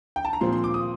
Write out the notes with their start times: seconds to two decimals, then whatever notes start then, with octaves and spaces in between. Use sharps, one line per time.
0.16 G5
0.25 A5
0.33 A#5
0.41 A#2 F3 C4 C6
0.53 C6
0.64 D6
0.74 D#6